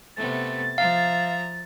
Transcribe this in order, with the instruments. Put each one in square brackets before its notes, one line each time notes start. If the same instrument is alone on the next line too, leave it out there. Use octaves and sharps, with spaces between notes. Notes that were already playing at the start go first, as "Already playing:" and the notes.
[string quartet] C3 A3 B3 [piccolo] A6
[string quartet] F3 E5 A#5 [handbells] F5